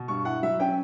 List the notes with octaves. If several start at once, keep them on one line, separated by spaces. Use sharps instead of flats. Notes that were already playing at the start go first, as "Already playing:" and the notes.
Already playing: B2
G2 C#6
E4 F#5
F#3 E5
C#4 G5